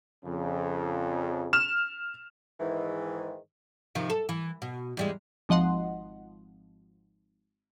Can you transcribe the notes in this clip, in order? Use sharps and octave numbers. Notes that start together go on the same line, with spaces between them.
F2 C#3
F6 E7
G#2 D#3 E3
C3 D#3 F3
A4
E3
B2
E2 G3 G#3
G#1 F3 D#5 F#5 C6